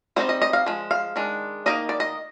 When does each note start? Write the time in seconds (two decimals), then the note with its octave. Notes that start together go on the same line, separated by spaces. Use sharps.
0.16 G3 C4 D#4 C5
0.29 D#5
0.42 D#5
0.53 F5
0.66 F3 G#3
0.91 F5
1.16 D#3 G#3 D4
1.66 D#3 A#3 D#4 D#5
1.89 D5
2.00 D#5